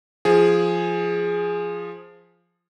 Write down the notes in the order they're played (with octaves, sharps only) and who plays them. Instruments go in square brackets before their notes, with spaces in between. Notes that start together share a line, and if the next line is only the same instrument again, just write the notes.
[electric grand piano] F3 G#4